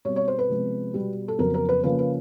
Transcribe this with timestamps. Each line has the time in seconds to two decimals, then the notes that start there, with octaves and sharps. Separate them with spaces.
0.05 B2 G3 C4 C#5
0.16 C#5
0.28 C5
0.39 B4
0.49 C3 F3 G#3 B3
0.94 B2 G3 B3
1.28 A4
1.38 F2 C#3 F#3 B3 A#4
1.54 A#4
1.69 B4
1.83 C#3 F3 A#3 B4
1.99 B4